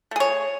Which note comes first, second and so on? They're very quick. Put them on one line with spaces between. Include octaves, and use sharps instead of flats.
A3 G#4 C#5